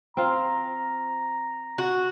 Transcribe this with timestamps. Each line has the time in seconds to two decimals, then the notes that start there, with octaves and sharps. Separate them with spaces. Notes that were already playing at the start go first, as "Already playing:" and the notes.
0.17 C4 F4 F5 A#5
1.78 F#4